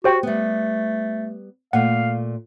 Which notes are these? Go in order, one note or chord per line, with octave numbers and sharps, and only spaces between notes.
F#4 G4 C5 G5
G3 A3 B3
A#2 A3 F5 F#5